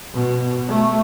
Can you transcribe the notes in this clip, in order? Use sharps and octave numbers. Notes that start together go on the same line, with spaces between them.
B2
A3